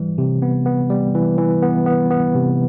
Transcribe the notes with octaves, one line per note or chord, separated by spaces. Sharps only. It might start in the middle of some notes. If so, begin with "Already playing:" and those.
Already playing: E3 G3
C3
B3
B3
G3
E3
E3
B3
B3
B3
C3